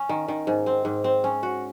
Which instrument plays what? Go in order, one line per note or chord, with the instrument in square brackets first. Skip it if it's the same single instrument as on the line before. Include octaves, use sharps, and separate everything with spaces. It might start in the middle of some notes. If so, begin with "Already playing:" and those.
Already playing: [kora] C#4
D#3
D#3
G#2
C4
G#2
C4
C#4
F#4